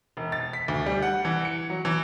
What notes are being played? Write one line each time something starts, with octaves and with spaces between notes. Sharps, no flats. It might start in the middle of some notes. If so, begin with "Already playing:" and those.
E1
A6
B6
D2
G3
F#5
E3
C#7
F#3
E3